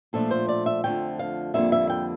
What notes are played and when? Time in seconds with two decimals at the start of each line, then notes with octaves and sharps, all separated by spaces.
0.13 A#2 F3 A3 D4 A4
0.31 C5
0.49 D5
0.66 E5
0.84 F2 D3 F3 A3 G5
1.19 F5
1.54 F2 D3 G3 A#3 E5
1.72 E5
1.89 G5